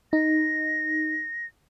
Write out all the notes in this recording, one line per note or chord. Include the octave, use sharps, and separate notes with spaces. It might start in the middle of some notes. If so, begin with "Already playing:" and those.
D#4 A#6